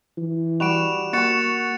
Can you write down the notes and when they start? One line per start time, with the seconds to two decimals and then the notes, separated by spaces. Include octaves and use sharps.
0.18 E3
0.60 G3 F#4 D7 E7 F7
1.13 A#3 F#4 C#6 A6 C#7 E7